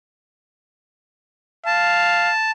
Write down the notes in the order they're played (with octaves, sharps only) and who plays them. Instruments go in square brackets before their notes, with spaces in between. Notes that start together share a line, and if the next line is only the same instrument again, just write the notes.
[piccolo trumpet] F5 [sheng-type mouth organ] A5